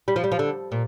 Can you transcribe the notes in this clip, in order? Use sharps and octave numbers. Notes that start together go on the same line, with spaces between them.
G3
F3
G3
F3
D3
A#2